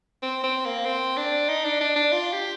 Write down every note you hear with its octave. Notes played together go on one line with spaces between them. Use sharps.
C4
C4
A#3
C4
D4
D#4
D4
D4
D4
F4
G4